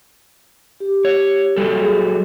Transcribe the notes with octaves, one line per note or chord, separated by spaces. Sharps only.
G4
C#5
F#3 G3 A4
G#4